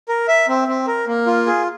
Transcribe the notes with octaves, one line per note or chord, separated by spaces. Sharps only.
A#4
E5
C4
C4
A#4
A#3
F4
G#4